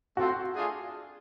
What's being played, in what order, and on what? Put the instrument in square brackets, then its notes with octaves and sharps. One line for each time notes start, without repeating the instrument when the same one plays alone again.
[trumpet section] A3 C4 F4 A4 C5 [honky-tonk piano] F#4
[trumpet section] A3 D4 F4 G#4